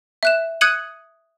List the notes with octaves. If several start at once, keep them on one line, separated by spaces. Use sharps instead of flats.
E5 F#6 E7
D#6 F#6 G#6 C#7 D#7 F#7